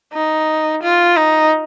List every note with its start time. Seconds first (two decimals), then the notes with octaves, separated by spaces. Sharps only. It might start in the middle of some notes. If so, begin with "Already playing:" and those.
0.13 D#4
0.83 F4
1.16 D#4